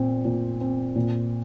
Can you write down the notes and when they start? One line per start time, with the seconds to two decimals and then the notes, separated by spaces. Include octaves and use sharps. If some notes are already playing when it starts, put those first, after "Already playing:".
Already playing: A#2 C4
0.25 A#2
0.61 C4
0.95 A#2